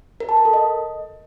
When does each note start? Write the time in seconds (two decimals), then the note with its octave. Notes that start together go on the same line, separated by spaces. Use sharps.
0.20 A#4
0.29 A5
0.37 A#4
0.45 A4
0.53 D#5